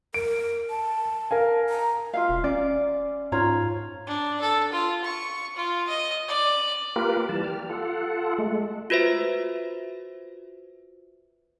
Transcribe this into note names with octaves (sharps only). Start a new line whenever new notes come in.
A#4 D7
A5
A#4 F5 G#5
A#5
F4 E5 F5
E1
C#4 D5
G#2 F4 C#5 A#5
D4
A4
F4
C#6
F4
D#5
D5
A#3 F4 G4 A#4 B4
E3 G3 A5
G4 F6
F4 A4 F#5
G#3 A3
F4 F#4 B4 C5 E5